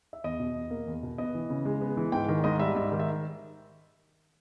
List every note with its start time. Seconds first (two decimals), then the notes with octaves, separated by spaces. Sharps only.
0.13 E5
0.24 E2 D#5
0.40 B2
0.56 E2
0.71 A#3
0.87 E2
1.03 B2
1.18 B3 D#5
1.35 E3
1.50 C#3
1.65 G#3
1.81 B3
1.97 E3
2.12 G#2 G5
2.28 D#3
2.44 G#2 D#5
2.59 G3 E5
2.75 G#2 E5
2.92 D#3
2.99 E5